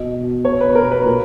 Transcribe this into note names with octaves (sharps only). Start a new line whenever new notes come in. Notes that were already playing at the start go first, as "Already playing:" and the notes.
Already playing: B2 D#5
B2
B2 C#5
B4
B2 A#4
B4
A#2